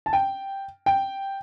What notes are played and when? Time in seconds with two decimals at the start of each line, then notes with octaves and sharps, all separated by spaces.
0.06 A5
0.13 G5
0.86 G5